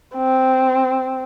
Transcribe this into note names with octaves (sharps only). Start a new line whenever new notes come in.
C4